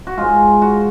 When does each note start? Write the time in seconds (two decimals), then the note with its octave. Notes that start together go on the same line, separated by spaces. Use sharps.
0.07 F#4
0.18 G#2 G#3 F4
0.62 F#4